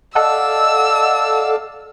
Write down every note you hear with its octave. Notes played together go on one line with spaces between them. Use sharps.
A4 D5 D#5 F5 F#5 A5 E6